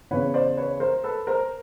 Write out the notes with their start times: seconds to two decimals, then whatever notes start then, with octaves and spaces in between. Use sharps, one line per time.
0.11 E2 C#3 E3 B4 C#5
0.34 C5 D5
0.57 B4 C#5
0.80 A#4 C5
1.04 A4 B4
1.27 A#4 C5